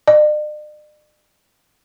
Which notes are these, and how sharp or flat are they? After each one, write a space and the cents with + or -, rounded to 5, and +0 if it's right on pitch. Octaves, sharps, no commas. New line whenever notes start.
D5 +45